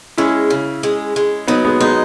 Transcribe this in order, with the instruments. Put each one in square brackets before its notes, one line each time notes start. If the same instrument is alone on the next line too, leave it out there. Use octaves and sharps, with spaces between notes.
[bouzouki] G#3 [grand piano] C#4 E4
[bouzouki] C#3
G#3
G#3
[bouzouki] F#3 [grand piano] B3 D#4
[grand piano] G#3 B3
[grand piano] G#3 B3 [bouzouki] D#4